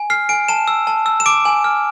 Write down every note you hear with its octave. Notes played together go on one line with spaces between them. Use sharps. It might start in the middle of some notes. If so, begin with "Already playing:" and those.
Already playing: G#5
F6 C7
G#5 D7
A5 E7
E6
A5
E6
E7
D6 D7
G#5
F6